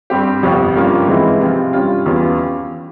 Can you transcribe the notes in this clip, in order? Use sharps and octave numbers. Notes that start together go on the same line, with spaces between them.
G2 G3 C4 G4
G1 F2 C3
G2 F3 A#3 C#4 F4
G#2 E3 G#3 C4 E4
C3 F3 C4 F4
G2 G3 C#4 F4
E2 E3 G3 C#4 F4